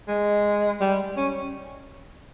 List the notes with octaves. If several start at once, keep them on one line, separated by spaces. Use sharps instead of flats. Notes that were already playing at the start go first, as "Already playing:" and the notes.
G#3
G3
C#4